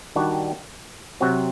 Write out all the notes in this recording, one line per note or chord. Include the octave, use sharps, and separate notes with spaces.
D#3 G3 D4 F#4
C3 F#3 C4 F#4